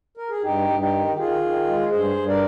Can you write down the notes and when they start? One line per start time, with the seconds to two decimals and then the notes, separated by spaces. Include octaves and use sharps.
0.17 A#4
0.30 G#4
0.43 G2 D#4 G4
0.68 G2
0.80 D#4 G4
0.92 D#3
1.13 G4
1.17 D#3 F4 G#4
1.42 D#3
1.67 G#3
1.91 G2 G#4 C5
2.16 G2
2.28 A#4 D5